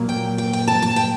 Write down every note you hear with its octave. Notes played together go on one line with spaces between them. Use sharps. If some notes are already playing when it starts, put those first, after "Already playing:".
Already playing: A#2 F#3 A#3
G5
G5
G5
A5
A5
G5